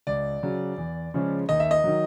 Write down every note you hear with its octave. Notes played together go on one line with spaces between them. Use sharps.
C#2 D5
C#3 F#3
E2
C#3 F3 G#3 C#4
D#2 D#5
E5
D#5
D#3 F#3